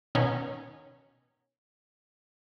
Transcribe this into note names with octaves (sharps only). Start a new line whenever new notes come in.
B2 D#3 C#4